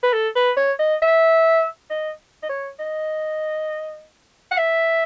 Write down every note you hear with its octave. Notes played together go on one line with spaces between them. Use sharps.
B4
A4
B4
C#5
D#5
E5
D#5
D#5
C#5
D#5
F#5
E5